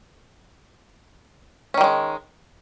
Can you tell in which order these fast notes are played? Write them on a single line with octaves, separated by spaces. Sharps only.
C#4 D#3 G3 G#3